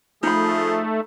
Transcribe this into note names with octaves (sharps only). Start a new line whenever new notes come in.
F3 A3 D#4 G#4 B5